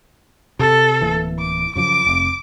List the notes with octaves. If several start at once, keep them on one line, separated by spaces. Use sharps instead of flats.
C3 A4
D1 E3 A#3
D6
F#2 C#3 F3 D6
F1